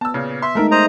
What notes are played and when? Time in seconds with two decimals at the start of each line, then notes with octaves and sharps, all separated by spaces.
0.01 B3 A5 E6
0.14 A#2 C#3
0.42 E5 C6
0.55 G#3 A3 D#4 A4 A#4
0.71 C5 D#5 A#5